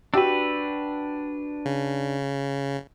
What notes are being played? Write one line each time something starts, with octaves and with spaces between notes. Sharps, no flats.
D4 F#4 G4 B4 E6
C#3